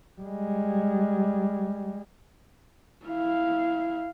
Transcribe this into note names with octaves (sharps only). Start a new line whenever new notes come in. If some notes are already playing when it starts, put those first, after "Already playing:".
G3 G#3
E4 F5